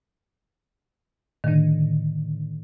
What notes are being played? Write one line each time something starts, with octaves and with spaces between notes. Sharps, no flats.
A2 D3 D#3